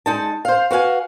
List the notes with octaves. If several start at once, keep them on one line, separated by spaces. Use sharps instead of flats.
G#3 D#4 A5
C5 F5
F#4 B4 F5 G#5